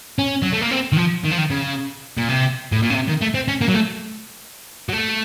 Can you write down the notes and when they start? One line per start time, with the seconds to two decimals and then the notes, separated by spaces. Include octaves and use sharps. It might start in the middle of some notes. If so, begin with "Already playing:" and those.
0.19 C#4
0.42 F#3
0.52 A3
0.61 A#3
0.71 C4
0.92 D#3
0.97 F3
1.24 D#3
1.31 F3
1.38 D#3
1.50 C#3
2.18 A#2
2.29 C3
2.72 A2
2.82 A#2
2.90 C#3
2.95 C3
3.08 D#3
3.22 A3
3.35 C4
3.48 C#4
3.61 A#3
3.68 F#3
3.74 A3
4.89 F#3
4.93 A3